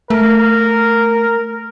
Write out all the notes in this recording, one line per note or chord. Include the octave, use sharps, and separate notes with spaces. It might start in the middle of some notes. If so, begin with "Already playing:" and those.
A3 A#4